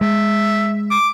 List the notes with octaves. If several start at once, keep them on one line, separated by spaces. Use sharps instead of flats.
G#3 E5
D6